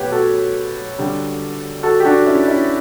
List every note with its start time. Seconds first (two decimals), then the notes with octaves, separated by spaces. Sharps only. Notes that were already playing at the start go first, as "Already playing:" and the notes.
Already playing: B2 F#3 A3 G4 B4 C#5 F#5
0.12 F#4 A4
0.98 D3 G3
1.83 F#4 A4
2.00 G4
2.05 D4 F#4
2.26 C#4 E4
2.48 C#4 E4